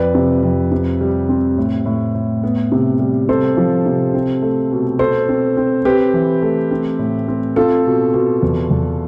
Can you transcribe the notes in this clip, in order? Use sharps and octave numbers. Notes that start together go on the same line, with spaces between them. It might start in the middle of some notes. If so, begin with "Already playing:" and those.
Already playing: F2 B4 D5
C3
F2
C3
G3
C4
A2
A2
A2
B3
C3
G3
C3 A4 C5
F3
C3
C4
A3
B2
B2 A4 C5
C4
C4
C4 G4 B4
E3
A3
C4
A2
C4
C4 F4 A4
B2
B2
E2
E2